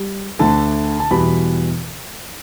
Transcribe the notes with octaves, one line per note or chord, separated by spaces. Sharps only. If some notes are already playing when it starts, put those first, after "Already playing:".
Already playing: G3
D2 D3 A3 A5
A5
E2 B2 G3 B5